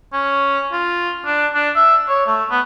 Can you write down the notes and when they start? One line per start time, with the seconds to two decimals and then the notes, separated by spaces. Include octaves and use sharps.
0.13 C#4
0.72 F4
1.26 D4
1.54 D4
1.76 E5
2.08 C#5
2.27 A3
2.50 B3